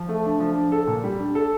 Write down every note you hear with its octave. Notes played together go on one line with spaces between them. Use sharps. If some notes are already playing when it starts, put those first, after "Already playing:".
Already playing: F3
A3
D4
F3
D4
A4
A#2
G3
D4
A4